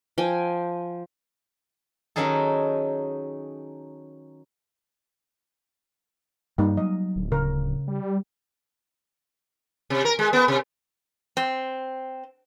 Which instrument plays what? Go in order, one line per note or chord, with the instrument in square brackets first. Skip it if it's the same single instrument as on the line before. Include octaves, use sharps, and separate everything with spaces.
[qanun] F3 G5 G#5
[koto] D#3 F#3 C#4 D#4 G#4 A4
[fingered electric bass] G2 [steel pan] G3 A#3 D#4
[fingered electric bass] F#3 [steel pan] D#5
[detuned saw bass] D1
[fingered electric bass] C#3 [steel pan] A#4
[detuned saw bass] G3
[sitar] C3
A#4
G#3
B3
C3
[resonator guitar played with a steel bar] C4